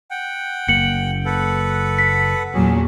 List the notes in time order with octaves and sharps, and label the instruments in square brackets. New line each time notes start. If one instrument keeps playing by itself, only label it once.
[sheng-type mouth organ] F#5 G5
[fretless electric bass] F#1 A#3 [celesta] C#7 F#7
[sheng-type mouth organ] A4 B4 F#5
[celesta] B6
[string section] E2 A#2 F#3 [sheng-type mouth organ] C#4 G#4